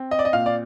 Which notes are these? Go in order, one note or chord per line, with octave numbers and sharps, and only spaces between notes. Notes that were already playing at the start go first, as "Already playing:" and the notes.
Already playing: C4
D#5
D5
D#5
A#2 F5
D5